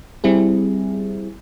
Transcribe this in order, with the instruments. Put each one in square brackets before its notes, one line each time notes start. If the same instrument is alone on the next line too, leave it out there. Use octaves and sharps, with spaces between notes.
[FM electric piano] G3 C4 E4 G#4